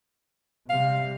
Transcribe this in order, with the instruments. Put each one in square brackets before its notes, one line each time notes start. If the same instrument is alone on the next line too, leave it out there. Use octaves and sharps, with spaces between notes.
[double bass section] C3 G3 [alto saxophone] F5